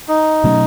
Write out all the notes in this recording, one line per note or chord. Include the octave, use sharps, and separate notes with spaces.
D#4
B2 F#3 A3 C#4